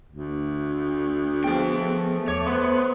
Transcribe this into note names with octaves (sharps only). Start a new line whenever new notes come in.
D2
F3 B3 G#4 G5
A3
E2 C#5 D6
B3 C5 C6 D#6